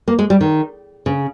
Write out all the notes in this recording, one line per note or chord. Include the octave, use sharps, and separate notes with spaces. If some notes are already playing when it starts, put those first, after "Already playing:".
A#3
G#3
G3
D#3
C#3